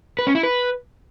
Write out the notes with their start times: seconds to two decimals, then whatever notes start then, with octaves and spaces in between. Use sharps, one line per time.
0.19 B4
0.27 C#4
0.35 E4
0.43 B4